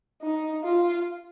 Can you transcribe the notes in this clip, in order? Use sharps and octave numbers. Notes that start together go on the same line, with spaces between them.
D#4
F4